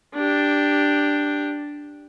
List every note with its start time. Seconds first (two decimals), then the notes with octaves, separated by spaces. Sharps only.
0.15 D4 G4